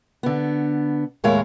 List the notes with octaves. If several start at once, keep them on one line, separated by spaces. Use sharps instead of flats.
D3 B3
D#2 A2 G#3 A#4 C#5 F5